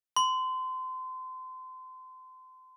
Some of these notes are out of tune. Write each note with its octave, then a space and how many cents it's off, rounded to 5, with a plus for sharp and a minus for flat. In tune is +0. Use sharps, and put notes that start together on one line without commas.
C6 -30